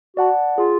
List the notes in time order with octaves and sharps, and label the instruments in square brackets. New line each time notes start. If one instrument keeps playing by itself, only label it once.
[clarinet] F#4 [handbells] D5 F#5 A5
[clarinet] F4 [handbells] G#4